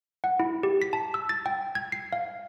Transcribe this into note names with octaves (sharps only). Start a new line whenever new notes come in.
F#5
E4
G4
B6
A5
E6
A6
G5
G#6
C7
F5